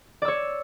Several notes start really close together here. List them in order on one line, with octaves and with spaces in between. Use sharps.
D5 E6 C#5